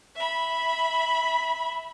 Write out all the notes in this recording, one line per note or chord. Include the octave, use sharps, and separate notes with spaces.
E5 B5